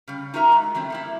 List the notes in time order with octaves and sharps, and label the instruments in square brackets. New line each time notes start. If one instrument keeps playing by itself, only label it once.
[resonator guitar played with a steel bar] C#3 G3
D#4 F4 F#4 A#4 E5 A#5
G#3
E3 F#3 A3 C4
G3 A#3 E4